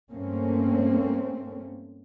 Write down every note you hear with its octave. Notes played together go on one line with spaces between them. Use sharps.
G2 A3 A#3 C4 C#4